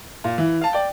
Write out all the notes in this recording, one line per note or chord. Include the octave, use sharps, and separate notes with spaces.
A#2
E3
F5 A5
D5 G5